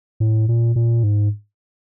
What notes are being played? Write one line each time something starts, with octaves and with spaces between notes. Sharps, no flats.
A2
A#2
A#2
G#2